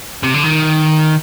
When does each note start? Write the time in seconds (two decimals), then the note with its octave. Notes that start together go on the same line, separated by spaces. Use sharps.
0.23 C3
0.34 D3
0.44 D#3